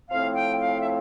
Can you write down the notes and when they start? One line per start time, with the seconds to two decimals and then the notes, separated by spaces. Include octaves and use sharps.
0.10 A2 F3 C4 F5
0.35 G5
0.60 F5
0.81 E5